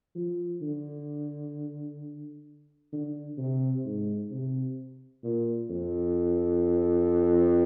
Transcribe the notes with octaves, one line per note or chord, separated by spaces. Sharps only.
F3
D3
D3
C3
G#2
C3
A#2
F2